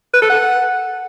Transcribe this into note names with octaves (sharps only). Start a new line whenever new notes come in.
B4
A4
F#5